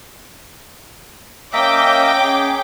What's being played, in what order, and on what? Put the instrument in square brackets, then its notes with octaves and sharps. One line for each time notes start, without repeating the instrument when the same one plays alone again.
[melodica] A#3 D#5 E5 [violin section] C#4 G5 D6
[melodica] G#4